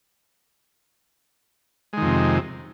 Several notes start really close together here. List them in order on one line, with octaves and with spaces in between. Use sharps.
G#3 D#3 F2 C3